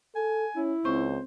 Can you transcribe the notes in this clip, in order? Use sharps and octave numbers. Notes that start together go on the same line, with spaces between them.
A4 G#5
C#4 E4
C#2 C4 C5 C#6